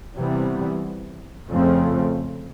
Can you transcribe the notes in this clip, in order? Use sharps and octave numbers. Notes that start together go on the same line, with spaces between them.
C3 E3 G3 B3
F2 C#3 F3 A3 C4